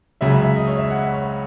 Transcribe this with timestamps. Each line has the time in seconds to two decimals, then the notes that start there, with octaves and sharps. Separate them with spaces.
0.21 C#2 C#3 F#3 E5
0.33 E5
0.44 E5
0.56 D#5
0.67 C#5
0.79 E5
0.91 F#5
1.02 E5
1.13 C#5